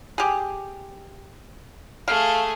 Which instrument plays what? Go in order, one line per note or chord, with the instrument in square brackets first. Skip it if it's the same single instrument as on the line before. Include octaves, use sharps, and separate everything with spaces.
[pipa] G4 G#4
[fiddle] A3 G#4 [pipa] F5